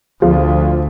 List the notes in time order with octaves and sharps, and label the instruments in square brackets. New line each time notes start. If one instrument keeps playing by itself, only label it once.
[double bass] D2 [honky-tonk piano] F3